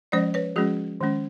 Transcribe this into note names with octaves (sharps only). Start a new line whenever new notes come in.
F3 G#3 C#4 C5 D5
B4 C#5
F3 G#3 C#4 F#4 G#4
D#3 G#3 C#4